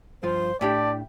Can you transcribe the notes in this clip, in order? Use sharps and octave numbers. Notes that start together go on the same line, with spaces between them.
G2 F3 F4 C5
A2 D4 E4 G4 D5 A5